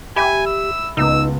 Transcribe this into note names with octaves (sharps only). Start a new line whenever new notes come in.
G4 E5 G#5 B5
E6
C#2 B3 D#4 E6